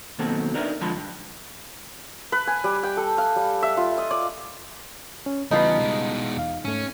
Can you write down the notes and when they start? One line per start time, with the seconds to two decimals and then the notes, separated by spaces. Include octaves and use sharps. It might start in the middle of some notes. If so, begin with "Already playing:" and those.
0.19 B2 D#3 F#3 A#3 C4 A4
0.54 D4 D#4 A#4 B4 D5 E5
0.81 D3 F3 G#3 A5 B5 C6
0.96 G2
2.32 B4
2.47 G#5
2.64 G3
2.83 G5
2.97 A4
3.18 F5
3.36 G3
3.63 E5
3.77 F4
3.98 D#5
4.11 D5
5.26 C#4
5.51 C#3 E3 G3 B3 D#4 F4 B4 A5
5.79 B2 G#3
6.37 E2 F5
6.65 G#2 A3 C#4